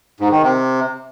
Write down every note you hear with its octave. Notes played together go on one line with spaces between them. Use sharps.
G#2
D#3
C3